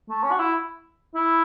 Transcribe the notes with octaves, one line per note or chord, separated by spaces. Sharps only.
A3
C#4
F#4
E4
E4